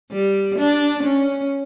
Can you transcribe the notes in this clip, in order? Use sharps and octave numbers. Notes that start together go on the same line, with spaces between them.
G3
D4
C#4